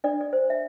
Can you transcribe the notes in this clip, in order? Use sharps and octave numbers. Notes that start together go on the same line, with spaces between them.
D4 D5
D5
C5
E5